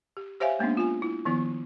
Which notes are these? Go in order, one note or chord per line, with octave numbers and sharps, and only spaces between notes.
G4
G4 C5 C#5 E5 F5 G#5
G#3 A#3 B3 C#4 D4
F4 G#5
E4
D#3 F3 B3 E4